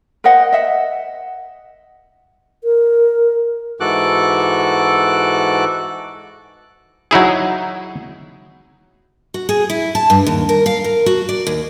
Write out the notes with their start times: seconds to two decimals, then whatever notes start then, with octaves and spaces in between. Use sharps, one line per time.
0.24 A#4 C5 D#5 F#5
0.53 D#5 E5 F#5
2.64 A#4
3.80 G#2 E3 F#4 A4 D6 F#6
7.11 F#3 D#4 E4 G#4
9.34 F#4
9.49 G#4
9.70 E4
9.95 A5
10.10 G2
10.27 D#2
10.49 A#4
10.66 F5
10.84 A#4
11.06 F#4
11.29 D5
11.47 D#2